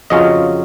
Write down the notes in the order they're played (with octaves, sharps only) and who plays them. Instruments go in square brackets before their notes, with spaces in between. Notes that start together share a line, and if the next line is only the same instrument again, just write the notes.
[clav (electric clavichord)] F2 C#3 F#3 C#4 F4 D#5